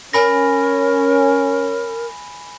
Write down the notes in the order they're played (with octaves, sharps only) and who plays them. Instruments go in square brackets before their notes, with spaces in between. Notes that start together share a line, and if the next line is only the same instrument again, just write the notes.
[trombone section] C#4 [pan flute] A#4 [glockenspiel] G#5 B5 A#6